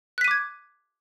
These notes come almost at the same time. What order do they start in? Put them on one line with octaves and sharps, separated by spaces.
F#6 B6 D#7 D6 G#6